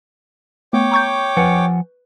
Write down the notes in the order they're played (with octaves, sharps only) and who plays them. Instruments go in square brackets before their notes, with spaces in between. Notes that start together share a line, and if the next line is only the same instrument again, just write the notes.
[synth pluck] A3 B3 [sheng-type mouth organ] C#5 G5 D6
[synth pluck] A#5 C#6 G6
[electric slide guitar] F3 F#5 G#5 [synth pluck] B4